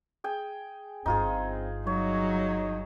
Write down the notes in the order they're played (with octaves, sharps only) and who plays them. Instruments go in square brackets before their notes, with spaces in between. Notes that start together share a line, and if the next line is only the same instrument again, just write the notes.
[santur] G#4 G5
[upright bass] G1 G2 [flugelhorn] C4 [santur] D#4 F4 G#4
[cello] F#3 [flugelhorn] D#4 [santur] C#5